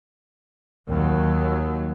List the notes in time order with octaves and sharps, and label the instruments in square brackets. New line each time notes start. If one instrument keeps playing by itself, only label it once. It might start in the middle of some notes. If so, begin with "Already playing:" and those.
[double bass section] D#2 F#3